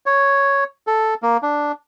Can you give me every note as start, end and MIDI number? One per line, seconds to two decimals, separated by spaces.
0.06 0.64 73
0.87 1.14 69
1.23 1.37 58
1.43 1.72 62